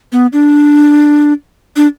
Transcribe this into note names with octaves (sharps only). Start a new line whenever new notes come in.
B3
D4
D4